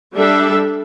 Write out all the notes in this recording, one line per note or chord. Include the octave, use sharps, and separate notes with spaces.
G3 D4 A4 E5